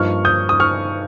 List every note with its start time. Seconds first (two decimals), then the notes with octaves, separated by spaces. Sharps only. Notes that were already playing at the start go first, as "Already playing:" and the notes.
Already playing: G2 F3 A#3 D#4 C#6 F6
0.25 D#6 G6
0.49 D#6
0.60 C#6 F6